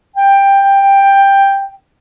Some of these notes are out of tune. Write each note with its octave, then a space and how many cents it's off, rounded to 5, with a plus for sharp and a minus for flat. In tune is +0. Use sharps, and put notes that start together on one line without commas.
G5 +10